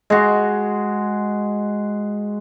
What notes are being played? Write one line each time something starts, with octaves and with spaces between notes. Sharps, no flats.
G#3 F#4